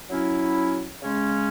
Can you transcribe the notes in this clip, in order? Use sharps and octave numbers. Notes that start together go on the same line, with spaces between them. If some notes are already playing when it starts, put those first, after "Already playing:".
F#3 C#4 E4
C#3 G#3 C#4